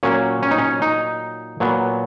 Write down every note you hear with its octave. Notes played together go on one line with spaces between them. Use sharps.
A#2 F#3 A#3 C#4
C#4
D#4
C#4
D#4
A#2 F#3 B3